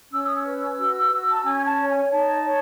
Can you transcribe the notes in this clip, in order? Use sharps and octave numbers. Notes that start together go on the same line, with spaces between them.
C#4 E6
D#6
E6
B4
F#4
F#4
A5
C#4 G#5
A5
C#5
G#5
D#4 A5
C#5